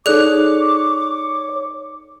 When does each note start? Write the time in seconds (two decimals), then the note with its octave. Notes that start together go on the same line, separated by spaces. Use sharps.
0.06 D#4 G#4 A4 C#5 D5 D6 F#6